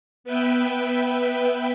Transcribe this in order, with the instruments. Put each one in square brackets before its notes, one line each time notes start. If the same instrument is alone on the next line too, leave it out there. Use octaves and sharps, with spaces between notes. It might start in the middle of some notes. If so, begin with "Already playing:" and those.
[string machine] B3 B4 E5 G5